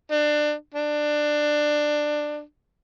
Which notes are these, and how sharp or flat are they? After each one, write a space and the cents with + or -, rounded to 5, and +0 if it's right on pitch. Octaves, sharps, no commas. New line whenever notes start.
D4 +25
D4 +15